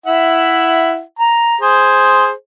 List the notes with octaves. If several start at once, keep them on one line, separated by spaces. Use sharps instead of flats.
E4 E5 F#5
A#5
G#4 C5